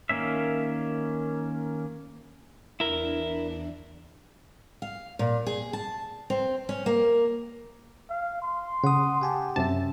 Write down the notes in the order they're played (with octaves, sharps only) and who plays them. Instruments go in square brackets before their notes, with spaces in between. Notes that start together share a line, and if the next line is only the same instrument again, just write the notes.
[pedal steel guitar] D#3 A#3 C#4 E5
[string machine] E2 E3 D4 [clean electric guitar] E4 A#4
[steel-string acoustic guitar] F5
A#2
G#4
A5
C4
C#4
A#3
[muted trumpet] F5
C6
[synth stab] C#3 [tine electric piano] F#5 D#6
[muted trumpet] G4 [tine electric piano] F#5 G#5 A5
[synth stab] F#2 C3 A5 [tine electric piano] C#4 E5